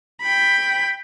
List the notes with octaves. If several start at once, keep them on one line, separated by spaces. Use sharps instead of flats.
G5 B5